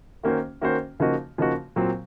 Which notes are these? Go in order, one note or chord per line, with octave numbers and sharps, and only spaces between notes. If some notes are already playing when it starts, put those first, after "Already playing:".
D#3 A#3 C#4 F#4 C5
D#3 A#3 C#4 F#4 C5
C#3 F3 A#3 D#4 F#4
C#3 F3 A#3 D#4 F#4
A#2 F#3 C4